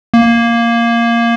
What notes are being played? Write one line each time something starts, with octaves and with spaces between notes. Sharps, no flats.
A#3